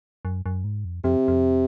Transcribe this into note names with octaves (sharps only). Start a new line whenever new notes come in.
F#2
F#2
G#2
F2
F2 C3
F2